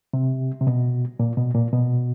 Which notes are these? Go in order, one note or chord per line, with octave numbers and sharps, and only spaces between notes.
C3
C3
B2
A#2
B2
A#2
B2